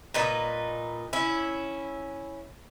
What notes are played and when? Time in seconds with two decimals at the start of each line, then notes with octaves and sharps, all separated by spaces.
0.14 A#2 D#4 B4
1.13 C#4 E4